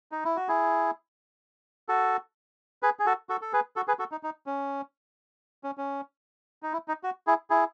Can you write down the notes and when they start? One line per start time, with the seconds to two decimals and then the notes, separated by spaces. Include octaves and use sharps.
0.12 D#4
0.25 E4
0.36 F#4
0.48 E4 G#4
1.88 F#4 A4
2.83 G#4 B4
2.99 G#4
3.06 F#4 A4
3.29 F#4 A4
3.41 A4
3.53 G#4 B4
3.76 F#4 A4
3.88 G#4 B4
3.99 F#4 A4
4.11 D#4
4.23 D#4
4.46 C#4
5.64 C#4
5.77 C#4
6.63 D#4
6.73 E4
6.88 D#4
7.03 F#4
7.27 E4 G#4
7.50 E4 G#4